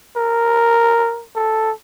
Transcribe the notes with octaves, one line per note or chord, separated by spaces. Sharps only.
A#4
A4